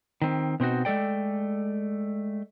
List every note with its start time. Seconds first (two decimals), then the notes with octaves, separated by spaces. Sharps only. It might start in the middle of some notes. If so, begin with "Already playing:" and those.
0.22 D#3 C4
0.60 B2 C4 D#4 F#4
0.85 G#3 A3 A4 D5 G5